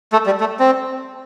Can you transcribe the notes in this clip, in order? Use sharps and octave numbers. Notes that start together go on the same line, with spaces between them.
A3
G3
A3
C4